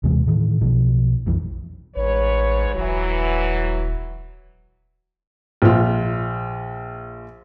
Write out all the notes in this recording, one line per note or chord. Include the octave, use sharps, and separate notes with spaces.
D#2 C3 E3 G#3
A2 D#3 E3
B1 B2 F3
A#1 F2 E3
A1 G#2 B4 C#5
D#1 E3 F#3
A#1 F4